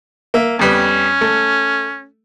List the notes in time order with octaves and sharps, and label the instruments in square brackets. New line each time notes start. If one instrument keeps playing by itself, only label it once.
[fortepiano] A#3 E5
[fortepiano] F2 G3 B3 [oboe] C#4
[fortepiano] A3